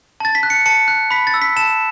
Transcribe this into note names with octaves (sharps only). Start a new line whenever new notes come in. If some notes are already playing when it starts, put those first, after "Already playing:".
A5 A6
B6
F#6
C#7
A5 C#7
F#6
B5 B6
A6
E6
B6
A5 E7